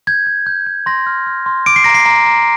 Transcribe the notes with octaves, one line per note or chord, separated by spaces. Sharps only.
G6 G#6
G6
G6
G6
C6 A#6
F6
F6
C6
D6 D7
C7
A#5 A#6
C7
A#5
A#5